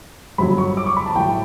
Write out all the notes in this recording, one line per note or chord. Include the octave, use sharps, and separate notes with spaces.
G1 G2 F#3 B5
C#6
D6
C#6
B5
A5
A1 A2 F#3 G5